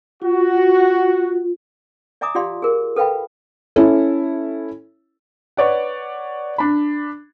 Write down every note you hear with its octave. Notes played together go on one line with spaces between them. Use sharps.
F4 F#4
D5 E5 G#5 A#5 D6 D#6
F4 G4 D5 F5 C6
G#4 A#4
A4 B4 F5 G5 B5
C#4 E4 A4
B4 C#5 D5 F#5
D4 B5